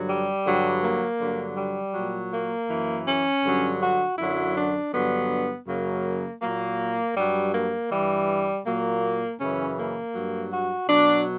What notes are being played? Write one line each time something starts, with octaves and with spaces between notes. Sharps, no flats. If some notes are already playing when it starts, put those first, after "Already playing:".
Already playing: G2 D3 F#3
G3
G2 D3 F#3
A#3
G2 D3 F#3
G3
A#2 F#3
A#3
F#2 E3
C#4
G2 D3 F#3
F#4
F#2 D3 F#3 E4
D4
G2 D3 F#3 B3
F#2 C#3 F#3 A#3
A#2 F#3 A#3
G2 F#3 G3
A#3
G2 E3 G3
A#2 F#3 A#3
F#2 C#3 E3 C#4
A#3
G2 F#3
F#4
B2 F#3 D4